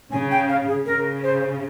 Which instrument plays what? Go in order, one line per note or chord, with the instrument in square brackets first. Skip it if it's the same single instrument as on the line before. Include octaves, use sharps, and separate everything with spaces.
[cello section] C#3 [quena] G#5
[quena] G5
F5
G#4
[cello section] C#3 [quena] A#4
[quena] C5